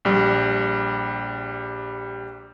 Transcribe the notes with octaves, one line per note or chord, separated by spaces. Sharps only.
A#1 G3